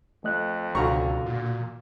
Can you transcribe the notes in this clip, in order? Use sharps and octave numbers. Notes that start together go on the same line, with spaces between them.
F2 A3 D#5 F#6
C#2 B2 D3 F#4 F5 A#5 C#6
A#2